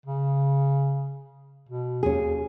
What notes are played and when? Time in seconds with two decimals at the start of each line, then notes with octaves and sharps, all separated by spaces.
0.06 C#3
1.69 B2
2.03 D#2 C#4 G#4